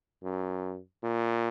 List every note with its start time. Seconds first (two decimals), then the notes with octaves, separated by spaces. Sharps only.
0.23 F#2
1.03 A#2